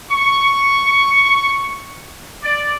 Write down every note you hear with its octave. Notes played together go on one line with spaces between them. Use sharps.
C#6
D5